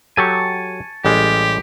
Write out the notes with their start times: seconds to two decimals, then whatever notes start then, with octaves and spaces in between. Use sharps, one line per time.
0.17 F#3 G4 A4 G#5 A5 C#6
1.05 A1 G3 G#3 G4